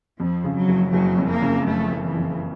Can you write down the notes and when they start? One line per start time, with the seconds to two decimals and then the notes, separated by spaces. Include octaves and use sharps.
0.20 F2 F3
0.44 C#3
0.57 F#3
0.68 F#1
0.93 F#1 F#3
1.18 F2
1.30 A#3
1.42 C#3
1.66 F#1 A3
1.92 F#1
2.04 E3
2.16 F2